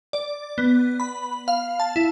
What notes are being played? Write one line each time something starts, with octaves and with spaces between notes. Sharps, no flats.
D5
B3
B5
F5
A5
E4